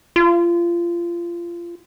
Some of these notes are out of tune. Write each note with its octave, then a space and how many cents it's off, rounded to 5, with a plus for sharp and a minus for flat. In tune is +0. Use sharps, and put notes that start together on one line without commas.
F4 -25